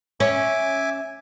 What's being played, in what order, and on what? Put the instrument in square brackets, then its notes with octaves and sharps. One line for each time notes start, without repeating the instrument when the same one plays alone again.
[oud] C#4 [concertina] E5 G#5 D6